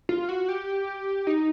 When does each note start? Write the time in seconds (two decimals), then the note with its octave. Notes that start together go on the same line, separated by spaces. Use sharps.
0.09 F4
0.29 F#4
0.49 G4
1.27 D#4